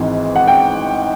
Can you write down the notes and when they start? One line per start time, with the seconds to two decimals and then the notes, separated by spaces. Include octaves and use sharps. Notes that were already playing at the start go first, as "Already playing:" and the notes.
Already playing: G#1 G#2 E3
0.36 F#5
0.48 G5